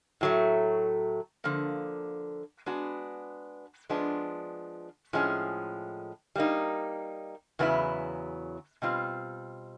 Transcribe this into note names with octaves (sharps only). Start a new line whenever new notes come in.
A2 F#3 A3
D3 F3 A#3
G#3 B3 D4 F#4
F3 G#3 B3 D4
A2 F3 G#3 C#4
G3 A#3 D#4
E2 C#3 F#3 B3 E4
B2 G3 C4 F4